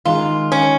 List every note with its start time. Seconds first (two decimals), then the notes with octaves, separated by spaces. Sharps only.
0.05 D#3 G#3 D#4 F4
0.52 C#4